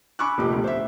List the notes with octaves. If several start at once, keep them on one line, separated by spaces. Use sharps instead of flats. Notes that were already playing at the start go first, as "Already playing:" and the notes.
G#5 B5 C#6 D6 E6 F#6
F1 A#2 G4
D2 B2
C5 E5